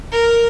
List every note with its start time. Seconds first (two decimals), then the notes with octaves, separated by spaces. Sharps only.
0.11 A#4